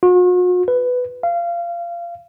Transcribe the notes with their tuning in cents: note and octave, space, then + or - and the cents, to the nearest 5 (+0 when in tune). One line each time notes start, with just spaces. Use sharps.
F#4 -45
B4 +10
F5 -25